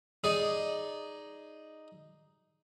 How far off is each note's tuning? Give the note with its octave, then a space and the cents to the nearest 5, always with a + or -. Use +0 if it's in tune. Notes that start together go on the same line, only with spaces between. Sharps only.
D#4 +0 G#4 +0 D5 +0